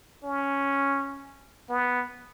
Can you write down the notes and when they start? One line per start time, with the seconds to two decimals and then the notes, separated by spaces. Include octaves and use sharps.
0.24 C#4
1.69 B3